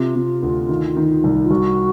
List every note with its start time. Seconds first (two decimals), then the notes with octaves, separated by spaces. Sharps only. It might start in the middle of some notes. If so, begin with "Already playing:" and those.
Already playing: C3 F4
0.15 C3
0.42 D2
0.69 D#3
0.97 D#3
1.24 C2
1.45 F4
1.50 C2 F#4